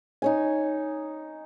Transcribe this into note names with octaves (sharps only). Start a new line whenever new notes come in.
D#4 C#5 G#5